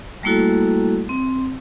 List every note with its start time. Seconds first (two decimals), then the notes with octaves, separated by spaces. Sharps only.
0.23 G3 A3 A#3 E4 F#4 A4
1.09 C4